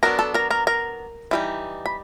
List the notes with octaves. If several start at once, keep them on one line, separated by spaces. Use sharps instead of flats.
F#3 B3 D4 A#4 A#5
A4 A5
A#4 A#5
A#4 A#5
A#4 A#5
E3 G3 C4 D#4
B5